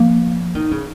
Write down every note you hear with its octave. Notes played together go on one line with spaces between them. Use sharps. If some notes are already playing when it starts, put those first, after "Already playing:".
Already playing: F3 A#3
D#3
C#3